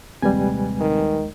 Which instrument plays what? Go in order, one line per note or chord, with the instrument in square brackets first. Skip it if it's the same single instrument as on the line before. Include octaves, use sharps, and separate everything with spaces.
[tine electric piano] A#1 D#2 G#3 [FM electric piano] C3 [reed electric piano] G3 B4 G#5
[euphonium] D#3